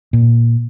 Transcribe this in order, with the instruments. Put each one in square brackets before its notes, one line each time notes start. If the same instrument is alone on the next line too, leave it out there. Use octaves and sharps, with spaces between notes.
[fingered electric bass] A#2